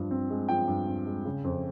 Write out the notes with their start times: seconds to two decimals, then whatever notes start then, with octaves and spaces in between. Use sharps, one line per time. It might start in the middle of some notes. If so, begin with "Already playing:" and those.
Already playing: G2 F3
0.11 C4
0.30 G#3
0.49 F3 G5
0.68 G2
0.87 C4
1.06 G#3
1.25 C#3
1.44 F2